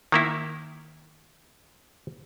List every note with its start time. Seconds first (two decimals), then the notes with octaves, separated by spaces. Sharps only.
0.12 D#3 A#3 E4